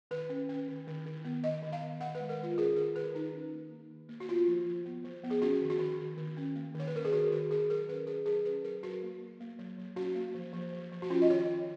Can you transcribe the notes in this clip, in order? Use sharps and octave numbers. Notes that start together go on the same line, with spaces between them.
D#3 B4
C#4
C#4
D#3
D#3
D#3
B3
D#3 D#5
D#3
F5
B3
D#3 F#5
G#3 B4
A#4
D#3 F4
C#4 G#4
D#3 A#4
D#3 B4
D#3 D#4
C#4
A#3
A#3
D#3
A#3
F#4
B3 F4
F3
F3
B3
F3
B3
G#4
C#4 F#4
D#3
F#4
D#3
D#3
D#3
C#4
A#3
D#3
C#5
B4
C#4 A#4
G#4
D#3 F#4
D#3 F#4
D#3 G#4
F#3 A#4
C#4 B4
C#4 G#4
F#3 G#4
C#4 B4
F#3 A#4
F#3 F#4
A#3
A#3
A#3
F#3
F#3
C#4 F#4
A#3
F3
F3
F3
F3
F#4
C#4 F4
D#5
D#3 C#5
D#3